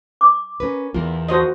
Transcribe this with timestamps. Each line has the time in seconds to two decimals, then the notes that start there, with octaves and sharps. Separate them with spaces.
0.21 D6
0.60 C#4 A#4 B4
0.94 E2 F4 A#4
1.29 F#4 C5 D#5